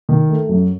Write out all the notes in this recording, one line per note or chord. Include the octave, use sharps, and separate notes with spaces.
D#3
A3
F#2